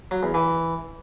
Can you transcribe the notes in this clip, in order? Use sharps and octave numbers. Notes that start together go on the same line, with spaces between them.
F#3
E2
E3